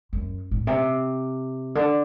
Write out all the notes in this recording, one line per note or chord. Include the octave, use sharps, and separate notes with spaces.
F#2
A2
C3
D3